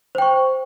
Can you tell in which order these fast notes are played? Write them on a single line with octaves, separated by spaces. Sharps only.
C5 G5 C#6